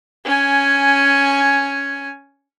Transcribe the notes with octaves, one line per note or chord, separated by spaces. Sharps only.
C#4 G#5